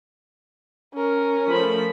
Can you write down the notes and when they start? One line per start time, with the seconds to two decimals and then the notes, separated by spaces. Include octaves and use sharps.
0.94 C#4 A#4
1.48 F3 A3 B5